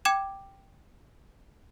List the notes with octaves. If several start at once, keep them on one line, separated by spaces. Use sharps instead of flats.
G5 D6 G#6 E7